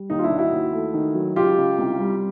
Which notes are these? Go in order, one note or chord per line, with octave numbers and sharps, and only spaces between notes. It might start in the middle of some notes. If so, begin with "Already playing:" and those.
Already playing: G3
D#2 D#4
F4
D4 E4
D#2
E4 F#4
D#2
A3
D#3
F#3
C#2 F4 G4
C#2
C2
G3